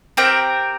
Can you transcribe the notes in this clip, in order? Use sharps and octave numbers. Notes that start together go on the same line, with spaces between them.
C4 G4 A#4 G5